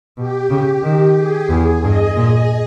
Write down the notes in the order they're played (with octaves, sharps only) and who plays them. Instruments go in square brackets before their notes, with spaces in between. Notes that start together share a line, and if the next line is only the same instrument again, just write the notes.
[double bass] B2 [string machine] G4
[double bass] C#3
D#3
[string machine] G#4
[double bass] E2
[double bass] G2 [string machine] D#5
[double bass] A#2